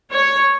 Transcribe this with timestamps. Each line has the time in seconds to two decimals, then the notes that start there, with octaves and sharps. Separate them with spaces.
0.11 C#5